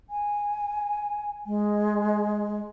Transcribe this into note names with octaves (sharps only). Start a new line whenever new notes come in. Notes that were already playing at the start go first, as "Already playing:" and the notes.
G#5
G#3